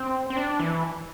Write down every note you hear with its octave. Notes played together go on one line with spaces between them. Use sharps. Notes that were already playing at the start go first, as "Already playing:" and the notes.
Already playing: C4
C4
D4
E3